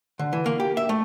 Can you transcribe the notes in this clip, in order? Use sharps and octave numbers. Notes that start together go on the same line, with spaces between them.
D3
E3
A#3
G4
E5
A3